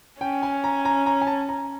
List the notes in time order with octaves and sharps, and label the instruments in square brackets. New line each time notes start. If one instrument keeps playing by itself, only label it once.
[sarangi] C#4 [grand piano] G5
[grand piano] G#5
A#5
A#5
A#5
G#5
A5
A#5